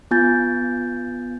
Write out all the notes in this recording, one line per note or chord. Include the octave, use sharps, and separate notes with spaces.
B3 F4 G#5 G6 A6